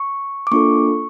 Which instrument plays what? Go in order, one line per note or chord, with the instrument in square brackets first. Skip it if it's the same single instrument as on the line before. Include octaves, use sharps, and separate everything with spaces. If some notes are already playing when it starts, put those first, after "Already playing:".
Already playing: [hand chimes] C#6
D6
A#3 D4 F4 A4 C#6